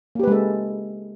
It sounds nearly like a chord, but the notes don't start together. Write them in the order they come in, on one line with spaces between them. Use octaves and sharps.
A#3 G4 B4 G#3 A4